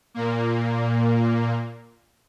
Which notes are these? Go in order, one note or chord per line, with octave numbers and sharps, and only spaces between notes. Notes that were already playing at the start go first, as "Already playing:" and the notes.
A#2 A#3